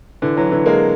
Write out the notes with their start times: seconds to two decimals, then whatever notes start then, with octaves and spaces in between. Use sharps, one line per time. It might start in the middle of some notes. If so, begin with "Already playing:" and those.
0.22 D3 E3
0.37 E3 F#3
0.51 D3 E3
0.66 G#3 A#3